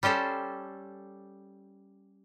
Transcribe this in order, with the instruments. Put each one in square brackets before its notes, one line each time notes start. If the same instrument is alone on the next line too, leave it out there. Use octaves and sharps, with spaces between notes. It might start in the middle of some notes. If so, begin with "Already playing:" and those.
[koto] G3 C#4 G4 A4 C5